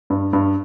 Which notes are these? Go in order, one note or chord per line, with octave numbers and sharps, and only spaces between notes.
G2
G2